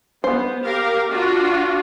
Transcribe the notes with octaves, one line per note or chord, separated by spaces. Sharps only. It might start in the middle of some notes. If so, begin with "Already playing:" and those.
B3 C5
G4 A#4 F5
D4 F4 F#4